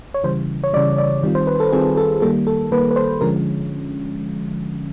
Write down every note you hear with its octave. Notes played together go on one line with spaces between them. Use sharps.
C#5
C#3 E3 G3 C5
C#5
C#3 E3 G3 D5
D5
D#3 G3 C4 F4
C5
B4
A4
D#3 G3 C4 F4 G#4
A4
D#3 G3 A#3 A4
A4
D#3 G3 A#3 B4
B4
C5
D3 F3 G#3 C#4 A#4